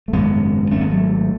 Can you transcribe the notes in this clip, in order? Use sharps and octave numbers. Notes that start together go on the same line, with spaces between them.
A3
G#1 F#2 C#3 G#3 B3
G#1 G#2 A3 C#4
G#3 B3
F#3 A3